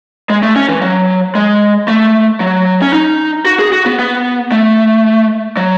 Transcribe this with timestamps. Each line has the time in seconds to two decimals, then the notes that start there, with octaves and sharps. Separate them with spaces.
0.30 G#3
0.43 A3
0.56 C#4
0.69 E3
0.82 F#3
1.35 G#3
1.88 A3
2.40 F#3
2.82 C#4
2.93 D#4
3.46 F#4
3.59 G#4
3.72 F#4
3.86 B3
3.99 B3
4.52 A3
5.57 F#3